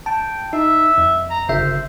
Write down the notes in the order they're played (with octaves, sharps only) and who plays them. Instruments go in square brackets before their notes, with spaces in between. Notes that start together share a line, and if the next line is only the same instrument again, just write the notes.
[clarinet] G5 [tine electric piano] A5
[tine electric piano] D#4 [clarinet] E5
[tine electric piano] F2
[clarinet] A#5
[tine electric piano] G1 C#3 E5 [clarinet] C5